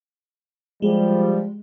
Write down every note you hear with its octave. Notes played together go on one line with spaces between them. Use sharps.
F3 G3 G#3